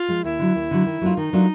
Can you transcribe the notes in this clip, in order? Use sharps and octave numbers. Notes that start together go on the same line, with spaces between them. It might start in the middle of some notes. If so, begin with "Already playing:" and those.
Already playing: F4
F3 G#3
D#2 E4
D3 F#3
D#2
D3 F#3
D#3
F#3 A3 D4 F4
D#3 D#4
F#3 A3 D4 F4